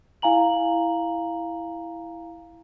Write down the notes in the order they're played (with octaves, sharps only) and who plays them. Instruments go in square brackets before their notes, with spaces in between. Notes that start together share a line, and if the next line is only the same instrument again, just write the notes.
[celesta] E4 F5 G#5 A#5 F#7